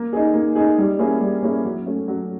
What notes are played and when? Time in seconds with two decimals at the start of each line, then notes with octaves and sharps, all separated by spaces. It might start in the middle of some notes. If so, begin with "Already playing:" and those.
Already playing: A#3
0.13 D#4 G#4
0.34 A#3
0.55 D#4 G#4
0.78 G3
0.99 A#3 C#4 E4 G#4
1.20 G3
1.43 A#3 C#4 E4 G#4
1.65 F#3
1.86 A3 C#4
2.08 F#3